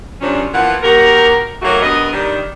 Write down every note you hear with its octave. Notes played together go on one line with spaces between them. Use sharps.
F#2 C3 F3 F#3 C#4 D4
E3 F3 A#3 B3 F#5
D#2 F#4 G4 A#4
D#3 F#3 A3 A#3 F#4 A#4
G2 B3 A#4 D#5
D#3 G3 D4